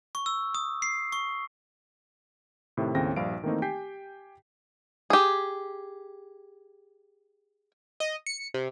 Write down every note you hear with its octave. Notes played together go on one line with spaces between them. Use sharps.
C#6
E6
D#6
C7
C#6
A2 C3 D#3
D#2 A2 C#3 C4 G5 A#6
A#1 G2 F5 D7
D#3 E3 A3 A#3 C4 D#4
G4 G5 G#5 G6 B6 C7
G4 G#4
D#5
C#7
C3